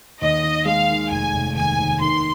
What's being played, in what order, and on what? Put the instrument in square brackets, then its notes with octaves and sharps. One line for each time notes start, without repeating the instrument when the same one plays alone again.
[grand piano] D#2 [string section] D#5
[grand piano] D#3
[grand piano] G#3 [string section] F5
[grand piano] D#3
[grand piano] F1 [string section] G#5
[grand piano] F1
[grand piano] D#2 [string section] G#5
[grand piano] D#2
[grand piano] D#3 [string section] C6